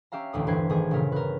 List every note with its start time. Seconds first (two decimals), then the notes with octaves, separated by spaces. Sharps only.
0.12 C#4 G4 E5 F5 A#5
0.33 E1 A1 D2 D#6
0.47 G1 E3 B4 C5 G#6 C7
0.70 A1 D#3 G#4 G#6
0.91 G1 A#2 C#3 A#4 B6
1.12 A#4 B4